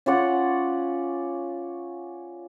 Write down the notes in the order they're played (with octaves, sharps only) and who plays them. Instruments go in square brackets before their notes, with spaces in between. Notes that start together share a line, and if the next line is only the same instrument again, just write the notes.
[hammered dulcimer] C#4 F4 D5 F#5